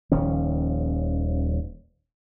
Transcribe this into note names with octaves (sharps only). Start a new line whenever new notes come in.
D#1 D#2 F3 C#4